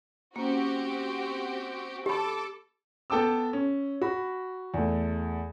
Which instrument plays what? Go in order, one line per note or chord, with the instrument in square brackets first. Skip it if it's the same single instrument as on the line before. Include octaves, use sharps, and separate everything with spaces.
[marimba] A#3 C#4 [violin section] C4 F#4 G4
[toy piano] G4 B5 [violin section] A4 D6
[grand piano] B3 A4 G5 A5 D6 E6
C#4
F#4 B5
E2 A3